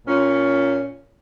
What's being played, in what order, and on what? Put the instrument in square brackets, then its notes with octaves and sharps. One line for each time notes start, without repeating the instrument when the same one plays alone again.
[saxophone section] A#2 C#4